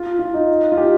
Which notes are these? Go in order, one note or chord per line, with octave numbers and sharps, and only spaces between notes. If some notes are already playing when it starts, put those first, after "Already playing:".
Already playing: F4
F4
D#4
F4
G4